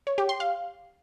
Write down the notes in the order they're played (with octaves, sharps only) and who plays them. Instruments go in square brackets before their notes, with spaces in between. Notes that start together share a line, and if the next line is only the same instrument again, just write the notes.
[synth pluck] C#5
G4
C6
F5